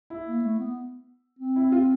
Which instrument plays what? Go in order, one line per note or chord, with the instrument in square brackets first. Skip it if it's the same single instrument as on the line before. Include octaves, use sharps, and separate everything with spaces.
[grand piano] E4
[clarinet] A#3
A3
B3
C4
[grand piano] E4
F4